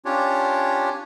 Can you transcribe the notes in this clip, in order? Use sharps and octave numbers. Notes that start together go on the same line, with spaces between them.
C#4 D4 F4 G4 C#5